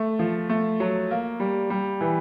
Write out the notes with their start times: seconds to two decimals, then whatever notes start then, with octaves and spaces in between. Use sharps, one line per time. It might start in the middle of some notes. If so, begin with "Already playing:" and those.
Already playing: A3
0.19 F3
0.49 A3
0.80 F#3
1.11 A#3
1.40 G3
1.70 G3
2.01 E3